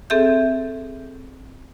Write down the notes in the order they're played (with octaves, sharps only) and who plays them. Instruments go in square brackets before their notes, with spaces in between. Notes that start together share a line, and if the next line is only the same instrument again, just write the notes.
[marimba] C4 G#4 A4 E5 G6